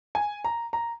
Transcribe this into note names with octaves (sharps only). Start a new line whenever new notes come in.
G#5
A#5
A#5